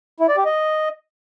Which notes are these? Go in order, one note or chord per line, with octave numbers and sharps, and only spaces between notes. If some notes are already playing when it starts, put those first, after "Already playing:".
E4
D5
G4
D#5